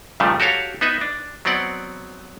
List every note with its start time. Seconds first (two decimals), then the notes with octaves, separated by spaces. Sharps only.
0.20 G2 A#2 C#3 F3 G3 A3
0.40 F#4 G4 A4 C#5 F5
0.81 B3 D#4 B4 E5
1.01 D4
1.45 F#3 B3 C4 D5 F#5